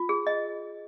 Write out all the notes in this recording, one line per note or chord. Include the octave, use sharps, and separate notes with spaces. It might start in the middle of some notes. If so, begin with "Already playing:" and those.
Already playing: F4
G#4
D#5